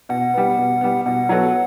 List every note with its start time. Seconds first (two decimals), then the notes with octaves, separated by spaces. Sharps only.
0.09 B2 F#5
0.34 G3 B3
0.57 B2
0.81 G3 B3
1.05 B2 F#5
1.29 F#3 B3 F#4 A4